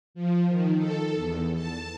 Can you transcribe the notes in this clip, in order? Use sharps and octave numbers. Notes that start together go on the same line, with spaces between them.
F3
D#3
A4
E2
A5